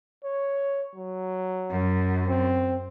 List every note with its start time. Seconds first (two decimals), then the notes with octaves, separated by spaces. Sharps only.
0.24 C#5
0.95 F#3
1.70 F#2
2.28 C4